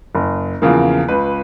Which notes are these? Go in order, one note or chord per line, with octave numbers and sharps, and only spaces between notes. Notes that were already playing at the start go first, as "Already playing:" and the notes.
F#1
E2 C#3 F3 A#3
C#2 B4